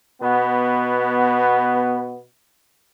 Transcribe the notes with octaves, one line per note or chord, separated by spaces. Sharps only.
B2 B3